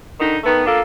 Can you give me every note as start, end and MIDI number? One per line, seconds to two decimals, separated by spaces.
0.19 0.36 50
0.19 0.36 51
0.19 0.36 63
0.44 0.62 51
0.44 0.62 57
0.44 0.62 59
0.66 0.80 58
0.66 0.80 62
0.66 0.80 65
0.66 0.80 69